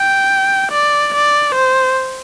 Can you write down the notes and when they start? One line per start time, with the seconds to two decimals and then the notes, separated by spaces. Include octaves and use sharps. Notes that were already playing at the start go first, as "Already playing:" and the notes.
Already playing: G5
0.72 D5
1.14 D5
1.55 C5